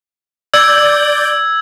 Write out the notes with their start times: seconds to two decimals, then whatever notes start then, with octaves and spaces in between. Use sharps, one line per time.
0.54 D5 E6 G6 G#6